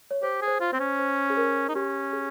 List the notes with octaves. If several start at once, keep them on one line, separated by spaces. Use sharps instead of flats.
C#5
G4 C5
G#4
C5
F4
C4 C5
C#4
C5
G#4
A#4
D#4
C#4 G4
G#4